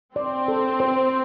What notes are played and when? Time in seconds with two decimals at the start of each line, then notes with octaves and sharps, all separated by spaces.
0.15 C4 D5
0.48 A4
0.80 C5